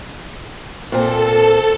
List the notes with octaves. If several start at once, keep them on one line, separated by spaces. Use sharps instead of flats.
A#2 C4 A4